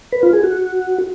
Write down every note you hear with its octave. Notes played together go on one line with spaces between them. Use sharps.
B4
F4
G#4
F#4